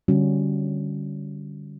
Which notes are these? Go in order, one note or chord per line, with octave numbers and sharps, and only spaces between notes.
D3 G3 C#4 F#4